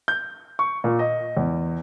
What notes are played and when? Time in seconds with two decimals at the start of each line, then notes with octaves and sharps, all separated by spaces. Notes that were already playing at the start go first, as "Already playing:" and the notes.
0.08 G6
0.59 C#6
0.84 A#2
0.99 D#5
1.37 E2